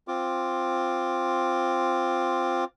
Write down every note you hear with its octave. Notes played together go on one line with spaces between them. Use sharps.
C4 F4 D6